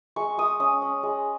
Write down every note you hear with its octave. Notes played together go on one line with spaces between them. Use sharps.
G#3 C#6
G#3 D#6
C#4 D#6
C#4
G#3